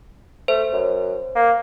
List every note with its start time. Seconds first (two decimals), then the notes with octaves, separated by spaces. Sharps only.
0.48 A3 C5
0.73 F#2
1.35 A#3